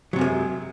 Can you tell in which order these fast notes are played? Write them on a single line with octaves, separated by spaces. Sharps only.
F#3 C3 F#2 A#3 G#3